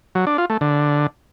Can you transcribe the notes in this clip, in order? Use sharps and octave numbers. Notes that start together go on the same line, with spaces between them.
F#3
D4
F4
A3
D3